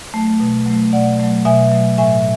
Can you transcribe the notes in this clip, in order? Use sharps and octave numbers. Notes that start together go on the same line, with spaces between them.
F#3 A3
B2
F#3 A3
B2 D5 F#5
F#3 A3
B2 E5 G#5
F#3 A3
A2 E5 G#5